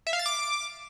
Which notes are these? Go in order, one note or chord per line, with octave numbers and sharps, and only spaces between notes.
E5
F5
A6
D6